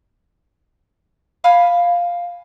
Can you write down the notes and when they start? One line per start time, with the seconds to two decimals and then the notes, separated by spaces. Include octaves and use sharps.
1.44 F5 G#5 B5 F6